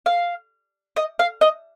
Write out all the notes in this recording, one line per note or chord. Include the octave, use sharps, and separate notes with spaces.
F5
D#5
F5
D#5